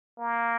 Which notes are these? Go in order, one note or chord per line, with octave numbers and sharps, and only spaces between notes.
A#3